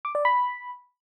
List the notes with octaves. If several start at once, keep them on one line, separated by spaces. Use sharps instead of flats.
D6
D5
B5